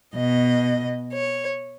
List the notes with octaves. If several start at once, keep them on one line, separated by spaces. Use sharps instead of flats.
B2 D#5
C#5